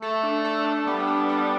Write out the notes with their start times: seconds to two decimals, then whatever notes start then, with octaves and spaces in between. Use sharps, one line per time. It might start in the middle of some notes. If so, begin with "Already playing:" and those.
0.02 A3 A4
0.23 D4
0.45 A4
0.65 D4
0.86 G3 B3
1.07 D4
1.29 B3